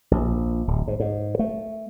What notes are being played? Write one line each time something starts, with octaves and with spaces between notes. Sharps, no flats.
A#1
D1
G#2
G#2
A3